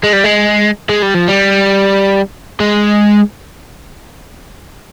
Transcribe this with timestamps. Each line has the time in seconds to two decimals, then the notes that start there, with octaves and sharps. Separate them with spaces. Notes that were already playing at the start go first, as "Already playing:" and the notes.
0.04 G#3
0.13 G3
0.24 G#3
0.89 G#3
1.02 G3
1.15 F3
1.28 G3
2.60 G#3